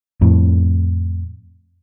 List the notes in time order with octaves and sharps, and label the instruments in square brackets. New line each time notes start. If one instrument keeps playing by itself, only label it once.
[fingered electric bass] F2 A2